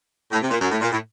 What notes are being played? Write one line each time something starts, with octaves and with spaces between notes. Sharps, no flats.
A2
C3
A#2
F#2
A2
A#2
A2